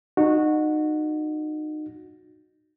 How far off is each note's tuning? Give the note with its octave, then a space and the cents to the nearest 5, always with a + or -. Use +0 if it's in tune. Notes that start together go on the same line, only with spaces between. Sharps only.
D#4 -25 F#4 -15